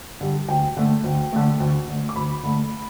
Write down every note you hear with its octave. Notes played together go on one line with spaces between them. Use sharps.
D3 G3
D2 G5
D3 A3
D2
D3 A3
D2
D3 A3
D6
D2 B5
D3 A3